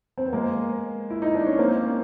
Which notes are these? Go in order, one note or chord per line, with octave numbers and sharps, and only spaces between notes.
C4
B3
G#3 A#3
E4
D#4
D4
C#4
A#3 C4